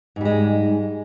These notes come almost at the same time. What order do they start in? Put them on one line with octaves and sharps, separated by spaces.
G#2 G3 G#3